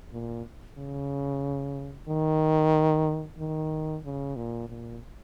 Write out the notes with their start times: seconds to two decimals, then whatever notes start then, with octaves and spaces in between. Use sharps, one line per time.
0.13 A#2
0.78 C#3
2.08 D#3
3.39 D#3
4.05 C#3
4.36 A#2
4.69 A#2